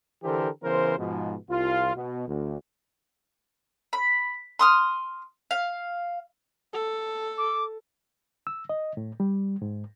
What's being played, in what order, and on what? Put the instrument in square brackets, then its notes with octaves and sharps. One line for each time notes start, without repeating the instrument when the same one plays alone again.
[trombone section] D3 E3 G4 A4 A#4 C5
C#3 E3 B3 A#4 C5
G#2 B2 F3
C2 F4
B2
D2
[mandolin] B5
C6 D#6 F6
F5
[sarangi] A4
[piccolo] D6
[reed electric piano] E6
D#5
A2
G3
G#2